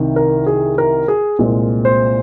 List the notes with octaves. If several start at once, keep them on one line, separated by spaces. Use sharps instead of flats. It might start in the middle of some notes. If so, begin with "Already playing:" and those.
Already playing: C2 C3 D#3
A#4
G#4
A#4
G#4
C2 A#2 G#3 C4
C5